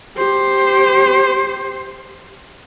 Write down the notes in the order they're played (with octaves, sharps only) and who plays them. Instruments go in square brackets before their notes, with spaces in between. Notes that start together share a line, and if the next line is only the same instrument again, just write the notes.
[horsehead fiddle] G4 C5